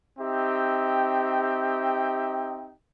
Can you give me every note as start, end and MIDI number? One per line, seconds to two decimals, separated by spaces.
0.19 2.74 60
0.19 2.74 63
0.19 2.74 67
0.19 2.74 76
0.19 2.74 79